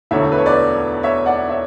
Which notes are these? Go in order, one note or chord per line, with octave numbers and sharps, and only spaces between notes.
E1 D2 D3 A3 C#5 E5
B4
C#5
B4 D5
C#5 E5
D5 F#5
C#5 E5